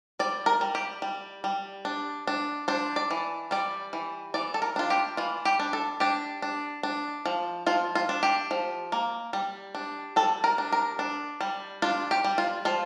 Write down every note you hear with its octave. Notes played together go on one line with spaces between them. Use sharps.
G3 D5
A#4
G3
G4
G3
G3
D4
D4
D4 C5
D5
E3
G3 D5
E3
E3 D5
A4
A#4
D4 F4
G4
E3 F4
G4
D4
A4
D4 G4
D4
D4
F3
F3 F4
F4
D4
G4
F3
A#3
G3
D4
G3 A4
A#4
D4
A#4
D4
G3
D4 F4
G4
G3
F4
F3 F4